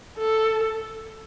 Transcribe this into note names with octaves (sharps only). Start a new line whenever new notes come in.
A4